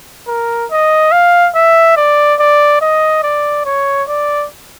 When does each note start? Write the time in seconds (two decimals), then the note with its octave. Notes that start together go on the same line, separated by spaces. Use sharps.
0.27 A#4
0.71 D#5
1.12 F5
1.55 E5
1.97 D5
2.40 D5
2.81 D#5
3.23 D5
3.65 C#5
4.08 D5